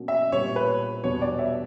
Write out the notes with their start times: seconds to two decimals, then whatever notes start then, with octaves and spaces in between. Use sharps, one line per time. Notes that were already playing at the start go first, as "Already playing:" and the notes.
Already playing: B2 F#3 A#3 C#4
0.08 E5
0.32 A#2 G3 B3 D4 G4 C#5
0.56 B4
1.03 E2 B2 G3 B3 D4 C#5
1.22 D5
1.39 E5